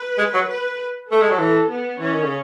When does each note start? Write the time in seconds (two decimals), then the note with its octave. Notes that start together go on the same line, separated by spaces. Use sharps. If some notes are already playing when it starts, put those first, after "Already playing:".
Already playing: B4
0.18 G#3
0.34 F#3
0.49 B4
1.09 A3 A4
1.22 G#3
1.30 F#3
1.39 E3
1.69 B3
1.99 E3 C#4
2.12 D#3
2.24 C#3